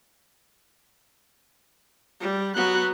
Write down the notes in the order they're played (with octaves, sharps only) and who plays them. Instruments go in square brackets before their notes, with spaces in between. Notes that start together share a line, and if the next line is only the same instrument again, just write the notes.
[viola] G3
[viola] F#3 B3 [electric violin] F#4 F#6